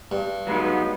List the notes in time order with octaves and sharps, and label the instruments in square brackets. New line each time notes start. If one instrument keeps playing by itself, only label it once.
[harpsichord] G2
[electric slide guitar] F#3 G#3 D#4 [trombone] B3